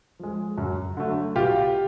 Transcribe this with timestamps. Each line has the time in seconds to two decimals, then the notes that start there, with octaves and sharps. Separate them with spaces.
0.19 F3 G#3
0.58 F#2
0.97 D3 F#3 A3
1.35 B2 F4 G4